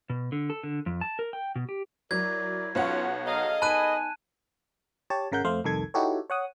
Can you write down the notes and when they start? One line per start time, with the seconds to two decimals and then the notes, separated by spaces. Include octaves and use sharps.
0.10 B2
0.32 D3
0.50 A4
0.63 D3
0.86 F2
1.01 A5
1.19 A#4
1.33 G5
1.56 B2
1.69 G4
2.11 F#3 E4 A#4 D5 G#6
2.75 B1 C#4 F4 C#5 F#5
3.26 G#4 A4 D#5 F5 A#5
3.62 B3 D#4 G#5 A5 B5 F#6 D#7
5.10 G4 C#5 A5
5.32 G#1 C#3 A#4 F#5 G6
5.45 F2 A3 C5 F5
5.64 C2 F2 D#3 A4 G#6
5.94 D#4 E4 F#4 G4 A4 C#5
6.30 C#5 F#5 D#6